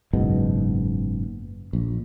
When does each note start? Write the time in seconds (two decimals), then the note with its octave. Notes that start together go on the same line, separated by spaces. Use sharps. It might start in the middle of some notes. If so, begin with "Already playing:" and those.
0.13 F#1 G#2 B2
1.73 A#1